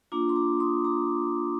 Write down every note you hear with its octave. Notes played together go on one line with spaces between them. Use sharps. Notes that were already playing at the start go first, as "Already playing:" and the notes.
A#3 D4 F4 A#5 D6
C6
A#5 D6
C6 D#6
A#5 D6